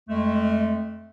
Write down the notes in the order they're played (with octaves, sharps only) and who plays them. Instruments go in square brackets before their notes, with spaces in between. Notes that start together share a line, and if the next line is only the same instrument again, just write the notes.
[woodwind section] F2 G#3 A3